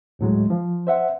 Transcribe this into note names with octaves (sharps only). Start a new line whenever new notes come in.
D2 A2 F#3 G#3
F3
C5 E5 F#5